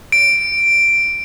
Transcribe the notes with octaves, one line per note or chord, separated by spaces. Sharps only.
D7